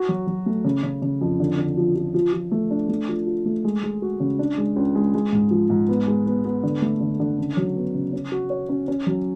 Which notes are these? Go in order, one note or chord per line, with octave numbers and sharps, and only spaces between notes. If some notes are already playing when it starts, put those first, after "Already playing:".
Already playing: F#4
F#3
F#3
A3
C#3
C#3
C#3
F2
D3
D3
F3
F3
F3
F3
A3
D4
A3
F3
F4
A3
G#3
G#3
F#4
C#3
D4
G#3
C#2
G#3
G#3
G#2
F3
G#2
B3
G#3
B3
B3
D3
A3
D3
D3
C#3
F#3
B3
C#3
C#4
F#4
C#5
C#4
C#4
F#3